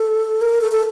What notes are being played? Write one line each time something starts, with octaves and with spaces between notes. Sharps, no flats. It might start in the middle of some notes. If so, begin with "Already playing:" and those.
Already playing: A4
A#4
A4
A4